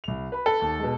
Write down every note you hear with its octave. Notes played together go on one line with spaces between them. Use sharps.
C2 F7
B4 B5
A4
D#2 A5 A6
B2 G#3